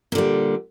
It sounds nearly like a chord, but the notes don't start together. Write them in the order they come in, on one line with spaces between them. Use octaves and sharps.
A#2 D3 G3